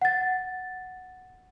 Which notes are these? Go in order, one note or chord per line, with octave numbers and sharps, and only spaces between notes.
F#5 A6